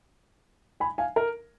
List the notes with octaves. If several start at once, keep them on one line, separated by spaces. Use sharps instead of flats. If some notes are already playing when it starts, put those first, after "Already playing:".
G#5 B5
F5 G#5
A#4